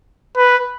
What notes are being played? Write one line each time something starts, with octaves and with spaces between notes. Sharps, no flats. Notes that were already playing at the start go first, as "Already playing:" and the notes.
B4